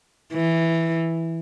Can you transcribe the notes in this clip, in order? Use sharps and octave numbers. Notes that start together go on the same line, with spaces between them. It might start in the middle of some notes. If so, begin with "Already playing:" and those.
E3